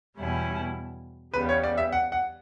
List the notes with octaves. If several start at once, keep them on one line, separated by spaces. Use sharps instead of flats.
E2 B2 G3 C#4 E4
E2 C#3 G3 B3 B4
C#5
D5
E5
F#5
F#5